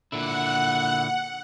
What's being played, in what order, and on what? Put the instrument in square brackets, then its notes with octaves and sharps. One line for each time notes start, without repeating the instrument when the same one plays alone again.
[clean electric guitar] A#2 D3 E4 [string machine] F#5